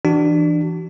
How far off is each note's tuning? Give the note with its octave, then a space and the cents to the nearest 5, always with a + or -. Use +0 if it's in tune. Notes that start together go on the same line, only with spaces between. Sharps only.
E3 +15 D4 +20 F#4 +35